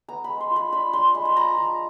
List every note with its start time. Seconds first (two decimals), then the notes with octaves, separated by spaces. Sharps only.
0.08 B3 A#5
0.24 G#3 B5
0.40 C6
0.51 F4
0.56 B5
0.72 D4 B5
0.93 D4 C6
1.14 G#3 B5
1.25 B5
1.36 F3 A#5
1.57 F3